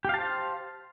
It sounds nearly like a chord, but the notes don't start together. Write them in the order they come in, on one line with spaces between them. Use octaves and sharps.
G4 F5 A5 C5